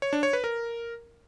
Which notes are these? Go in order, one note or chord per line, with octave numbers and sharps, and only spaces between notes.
C#5
D4
C#5
B4
A#4